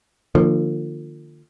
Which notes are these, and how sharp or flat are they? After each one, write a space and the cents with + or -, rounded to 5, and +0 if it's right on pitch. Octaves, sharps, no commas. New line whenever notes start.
D3 +40 F3 +0 A#3 +0